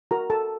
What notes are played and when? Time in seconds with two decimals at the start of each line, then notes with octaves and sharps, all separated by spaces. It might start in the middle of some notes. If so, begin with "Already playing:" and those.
0.11 F#4 A#4 A#5
0.30 A4 A5